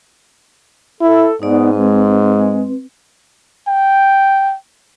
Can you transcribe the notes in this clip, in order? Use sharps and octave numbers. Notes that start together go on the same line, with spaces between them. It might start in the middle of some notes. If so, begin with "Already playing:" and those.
E4 A4
G#2 B3 D#4 D5
G#3 C4 B4
G5